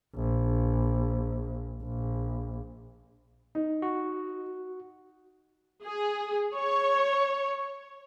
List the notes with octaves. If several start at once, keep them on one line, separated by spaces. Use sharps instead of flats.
A#1
A#1
D#4
F#4
G#4
C#5